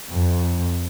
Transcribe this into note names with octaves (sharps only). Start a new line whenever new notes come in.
F2